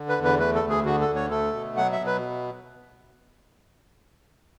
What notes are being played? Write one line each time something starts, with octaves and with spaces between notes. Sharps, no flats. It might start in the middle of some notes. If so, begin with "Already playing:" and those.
Already playing: D3
B4
E2
B4
A3 B4
A4
D2
G#4
D3 F#4
A4
D2
C#5
A3 A4
B2
F#3 F#5
E5
B2
B4